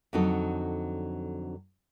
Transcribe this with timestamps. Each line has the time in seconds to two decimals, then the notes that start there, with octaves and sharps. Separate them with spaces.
0.13 F2 D3 F#3 C4 D#4 A4